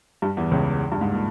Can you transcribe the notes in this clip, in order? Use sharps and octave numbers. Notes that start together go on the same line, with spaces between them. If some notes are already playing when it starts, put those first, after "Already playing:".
G2 G3
E2 E3
C#2 C#3
G2
G#2
A#2